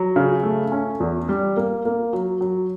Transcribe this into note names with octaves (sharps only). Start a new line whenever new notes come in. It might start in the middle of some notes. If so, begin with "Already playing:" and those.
Already playing: F#3
C#3
A3
C#4
E2
G3
A#3
A#3
F#3
F#3